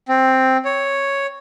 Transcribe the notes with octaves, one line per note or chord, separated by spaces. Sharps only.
C4
C#5